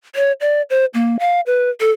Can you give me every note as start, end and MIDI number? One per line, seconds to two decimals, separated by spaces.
0.16 0.32 73
0.41 0.62 74
0.70 0.85 72
0.94 1.16 58
1.19 1.41 77
1.46 1.70 71
1.80 1.91 69